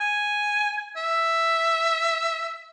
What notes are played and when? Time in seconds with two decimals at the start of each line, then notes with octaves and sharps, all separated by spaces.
0.01 G#5
0.97 E5